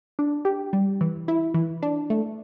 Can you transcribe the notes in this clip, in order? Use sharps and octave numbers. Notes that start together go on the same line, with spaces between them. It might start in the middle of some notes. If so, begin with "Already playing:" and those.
D4
G4
G3
E3
E4
E3
D4
A3